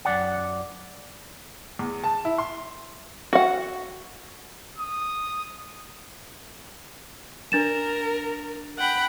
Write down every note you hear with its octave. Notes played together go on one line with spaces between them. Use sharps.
F#2 D5 F#5
E2
A5
E4
C6
F#4 F#5
D#6
D4 A#4 A6 E7
F#5 G5 B5